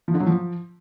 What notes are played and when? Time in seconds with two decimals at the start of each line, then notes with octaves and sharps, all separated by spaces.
0.08 F3
0.14 D3
0.20 F#3
0.26 F3